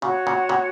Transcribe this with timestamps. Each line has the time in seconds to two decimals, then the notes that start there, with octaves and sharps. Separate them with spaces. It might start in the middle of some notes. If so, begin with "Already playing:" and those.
0.02 A#2 C#3 F#4 C#5 F#5
0.27 A#2 C#3
0.49 A#2 C#3